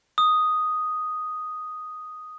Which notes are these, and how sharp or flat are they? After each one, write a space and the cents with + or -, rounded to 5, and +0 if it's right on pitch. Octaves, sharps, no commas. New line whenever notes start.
D#6 +0